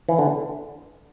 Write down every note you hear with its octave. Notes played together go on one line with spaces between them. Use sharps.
E3
D3